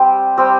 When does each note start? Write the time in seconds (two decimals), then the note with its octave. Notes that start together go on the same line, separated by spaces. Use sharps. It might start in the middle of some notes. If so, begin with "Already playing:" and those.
Already playing: G3 C4 G4
0.37 G3 C4 G4